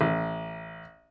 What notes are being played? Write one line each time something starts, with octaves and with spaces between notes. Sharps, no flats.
A1